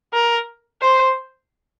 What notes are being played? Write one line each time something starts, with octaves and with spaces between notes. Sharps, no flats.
A#4
C5